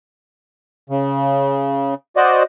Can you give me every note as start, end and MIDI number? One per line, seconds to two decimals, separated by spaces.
0.90 1.94 49
2.16 2.43 66
2.16 2.43 72
2.16 2.43 74
2.16 2.43 75